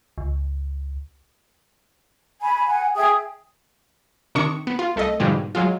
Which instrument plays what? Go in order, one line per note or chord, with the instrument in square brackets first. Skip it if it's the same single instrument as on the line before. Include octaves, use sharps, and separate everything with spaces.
[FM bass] C#2
[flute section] G#5 B5
F#5 G#5
G#4 E5 G5 D#6
[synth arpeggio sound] C3 D#3 D4 C#6 D#6 C#7
B3
F4
C2 A3 A4 D#5
G#2 B2 D3 F3 G3 G#3
F#3 G#3 F4